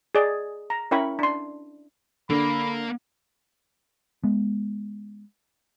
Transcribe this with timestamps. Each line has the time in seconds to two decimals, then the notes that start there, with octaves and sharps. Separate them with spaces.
0.15 G#4 D5 D#5
0.70 A#5
0.91 C#4 E4 A#4 G5 B5 C#6
1.19 D4 C6
2.30 D3 A#3 B5
4.24 G#3 B3